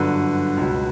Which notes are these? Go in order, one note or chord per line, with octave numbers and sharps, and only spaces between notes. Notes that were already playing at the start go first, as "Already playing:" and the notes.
Already playing: G1 F#2 D3 B4
C#2 B2